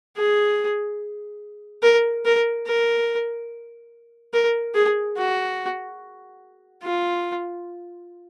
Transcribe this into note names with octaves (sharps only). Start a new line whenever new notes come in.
G#4
A#4
A#4
A#4
A#4
G#4
F#4
F4